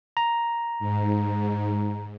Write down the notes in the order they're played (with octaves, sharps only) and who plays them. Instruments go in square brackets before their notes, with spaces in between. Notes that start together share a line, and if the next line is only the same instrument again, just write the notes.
[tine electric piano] A#5
[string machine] G#2